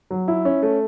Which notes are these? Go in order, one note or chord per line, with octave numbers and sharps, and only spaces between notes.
F#3
E4
C#4
A3